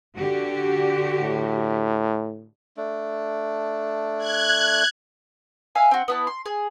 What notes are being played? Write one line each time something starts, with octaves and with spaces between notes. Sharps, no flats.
D3 F#4 G4
A2
A3 D4
F#6 G#6
E5 F5 G#5
C4 F#4
B3 E4 A5
C6
G#4